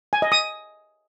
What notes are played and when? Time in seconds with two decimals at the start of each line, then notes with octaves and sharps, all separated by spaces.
0.13 G#5
0.22 D#5
0.32 D#6